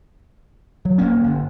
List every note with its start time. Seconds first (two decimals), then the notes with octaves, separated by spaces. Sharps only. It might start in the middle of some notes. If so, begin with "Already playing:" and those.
0.85 F#3
0.98 D#1 A#3 C#4
1.24 G1